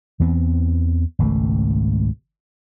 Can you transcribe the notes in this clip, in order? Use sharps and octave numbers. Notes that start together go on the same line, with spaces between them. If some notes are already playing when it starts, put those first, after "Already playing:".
E2 E3 B3 C4
G#1 C#2 B2 A3